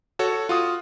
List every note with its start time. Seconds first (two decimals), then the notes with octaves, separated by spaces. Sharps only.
0.19 F#4 A4 C#5
0.49 F4 F#4 D#6